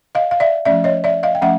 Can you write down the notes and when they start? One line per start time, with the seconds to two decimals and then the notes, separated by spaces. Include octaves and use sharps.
0.15 D#5 F5
0.31 F5
0.40 D5 E5
0.65 F3 A3 C#4 D5 E5
0.84 C#5 D#5
1.04 D5 E5
1.23 D#5 F5
1.35 G5
1.41 F3 A3 C#4 E5 F#5